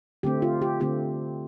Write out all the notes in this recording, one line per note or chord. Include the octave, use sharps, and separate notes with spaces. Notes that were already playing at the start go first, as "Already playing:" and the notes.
D3 A3 C4 G4
F4
G4
D3 A3 C4 G4